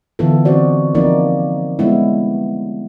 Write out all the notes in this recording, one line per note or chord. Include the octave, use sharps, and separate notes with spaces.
D3 E3 B3 E4 F4 A4
E3 C4 F#4 C5 D5
F3 A#3 C4 C#4 D#4 D5
G3 G#3 B3 C#4 E4